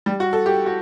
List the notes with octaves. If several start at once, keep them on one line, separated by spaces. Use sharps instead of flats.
G3
F#4
A4
G4
F#4